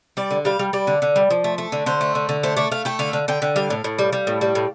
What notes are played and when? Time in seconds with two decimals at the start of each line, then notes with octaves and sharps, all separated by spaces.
0.17 G3 D5
0.31 D3
0.45 G3 F5
0.59 G3
0.73 G3 D5
0.87 D3
1.02 D3
1.16 G3
1.30 F3
1.44 A3
1.58 A3
1.72 D3
1.86 D3 C5
2.01 A3
2.15 D3
2.29 D3
2.43 A3 C5
2.57 A3 D5
2.71 A3 F5
2.85 A3 G5
2.99 D3 F5
3.13 D3
3.28 D3 G5
3.42 D3
3.56 G3 F5
3.70 A2
3.84 A2
3.99 G3
4.13 G3
4.27 A2
4.41 G3
4.55 A2